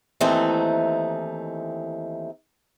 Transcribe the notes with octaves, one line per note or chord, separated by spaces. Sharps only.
D#2 E3 A3 C4 D#4